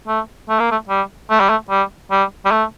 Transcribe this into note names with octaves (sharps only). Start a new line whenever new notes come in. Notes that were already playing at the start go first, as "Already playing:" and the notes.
A3
A3
A#3
A3
G3
A3
G3
A3
G3
G3
G3
A3